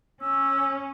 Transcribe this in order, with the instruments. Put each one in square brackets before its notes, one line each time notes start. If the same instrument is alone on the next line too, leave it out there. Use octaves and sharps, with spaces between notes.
[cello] C#4 [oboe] E6